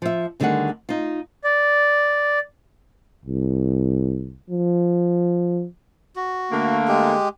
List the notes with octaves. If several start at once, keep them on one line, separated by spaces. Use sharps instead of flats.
F3 E5
D2 D3 D#3 G3 G#4 F#5
D#4 F4
D5
C2
F3
F#4
D3 A3 A#3
G#3 G4